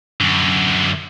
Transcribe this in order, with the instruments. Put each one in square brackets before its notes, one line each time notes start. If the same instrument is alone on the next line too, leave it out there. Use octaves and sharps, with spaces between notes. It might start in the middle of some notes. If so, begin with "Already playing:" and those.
[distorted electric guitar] F#2 D3